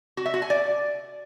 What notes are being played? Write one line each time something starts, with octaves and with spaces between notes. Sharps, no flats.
F#4
E5
F#4
G#5
D5